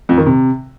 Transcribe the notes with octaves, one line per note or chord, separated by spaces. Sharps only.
F2
D#3
C3